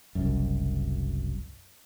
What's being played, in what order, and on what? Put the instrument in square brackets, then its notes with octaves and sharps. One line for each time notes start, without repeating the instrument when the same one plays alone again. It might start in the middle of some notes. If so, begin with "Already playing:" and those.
[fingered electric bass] F#1 C2 F#2